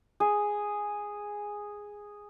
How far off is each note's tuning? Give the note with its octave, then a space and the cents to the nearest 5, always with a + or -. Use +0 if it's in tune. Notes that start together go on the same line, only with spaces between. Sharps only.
G#4 -5